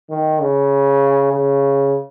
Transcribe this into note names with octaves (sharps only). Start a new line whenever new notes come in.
D#3
C#3
C#3